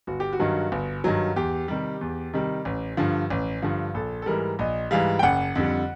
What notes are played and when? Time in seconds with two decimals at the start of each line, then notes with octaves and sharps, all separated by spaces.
0.07 G1 F#4
0.20 G4
0.33 F#4
0.39 G2 D#3 F#3
0.72 G1
1.04 G2 D#3 F#3
1.36 E2 G4
1.68 C3 D#3 G3
2.01 E2
2.34 C3 D#3 G3
2.65 A1
2.97 G2 D3 F3
3.30 A1
3.62 G2 D3 F3
3.94 A#1 A4
4.22 A4
4.26 G#2 E3 G3 A#4
4.59 A#1 D#5
4.91 G#2 E3 G3 F5
5.19 G5
5.23 F#1 F#5
5.55 F2 D3 G3